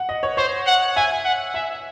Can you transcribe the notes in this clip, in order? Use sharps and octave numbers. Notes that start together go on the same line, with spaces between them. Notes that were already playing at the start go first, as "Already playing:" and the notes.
Already playing: F#5
D#5
C#5
C5 C#5
F#5
E5 G#5
F#5
E5 G#5